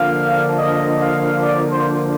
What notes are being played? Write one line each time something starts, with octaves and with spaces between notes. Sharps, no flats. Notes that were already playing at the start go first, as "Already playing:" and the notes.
Already playing: D3 F3 A#3 D4 F5
D#5
F5
D5
C5